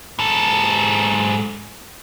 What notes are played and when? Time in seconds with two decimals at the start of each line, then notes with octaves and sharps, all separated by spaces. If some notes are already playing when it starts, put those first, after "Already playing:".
0.19 G#2 A4